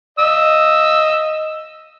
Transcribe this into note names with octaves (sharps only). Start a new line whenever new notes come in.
D#5 E6